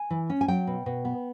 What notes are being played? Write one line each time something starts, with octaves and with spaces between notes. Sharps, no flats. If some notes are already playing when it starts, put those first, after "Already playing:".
Already playing: G#5
E3
C#4
G#5
F#3 G5
B2
B2
B3